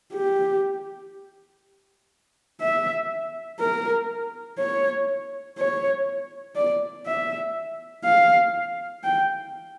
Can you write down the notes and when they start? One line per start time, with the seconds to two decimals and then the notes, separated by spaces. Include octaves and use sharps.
0.13 G4
2.61 E5
3.60 A#4
4.58 C#5
5.58 C#5
6.56 D5
7.06 E5
8.04 F5
9.04 G5